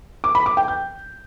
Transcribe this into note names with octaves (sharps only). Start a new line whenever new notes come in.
D6
B5
D6
G5
G6